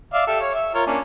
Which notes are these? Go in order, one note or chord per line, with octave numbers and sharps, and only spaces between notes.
D5 E5 F5
G4 A4 E5
C#5
E5
F4 A#4 C#5
A#3 C#4 D4